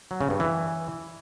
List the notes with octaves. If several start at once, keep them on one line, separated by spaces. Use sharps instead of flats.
F#3
C#3
G2
E3